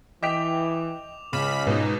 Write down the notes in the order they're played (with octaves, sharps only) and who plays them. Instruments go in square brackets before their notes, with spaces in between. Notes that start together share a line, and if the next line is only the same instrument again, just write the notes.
[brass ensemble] E3 [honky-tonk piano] D#5 G5 B6 [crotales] D6 F7
[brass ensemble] C#2 [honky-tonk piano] C#3 [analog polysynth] B5 [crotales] D6
[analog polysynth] G#2 D#4 [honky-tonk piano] B2